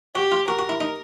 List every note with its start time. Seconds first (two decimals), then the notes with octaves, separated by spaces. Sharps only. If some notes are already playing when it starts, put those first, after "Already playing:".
0.15 F#4 G4
0.32 F4
0.48 F#4 A#4
0.59 F#4
0.69 E4
0.81 D#4